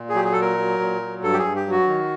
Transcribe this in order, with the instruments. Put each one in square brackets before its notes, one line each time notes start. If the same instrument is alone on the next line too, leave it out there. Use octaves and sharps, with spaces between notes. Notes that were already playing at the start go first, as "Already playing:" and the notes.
Already playing: [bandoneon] A#2
G#4
F#3 G4
G#4
A4
A#2
A#4
F#3
A#2
F#3
G2 A4
G4
G#4
G2
G4
F#3
F#4
D#3